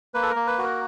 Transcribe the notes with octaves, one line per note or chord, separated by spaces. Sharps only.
A#3 B4
A4
A#4
A#3
B4
F#4 A#4